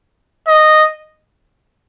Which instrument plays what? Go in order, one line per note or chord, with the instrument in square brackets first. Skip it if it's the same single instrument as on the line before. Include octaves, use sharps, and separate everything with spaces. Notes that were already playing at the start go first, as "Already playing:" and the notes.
[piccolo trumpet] D#5